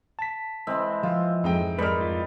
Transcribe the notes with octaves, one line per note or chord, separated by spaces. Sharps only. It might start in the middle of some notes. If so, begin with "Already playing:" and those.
A5 B6
E3 G#3 C4
F3 F4
F2 G#2 D#5 G5
G#2 G3 G#3 A#4 B4 F6
F4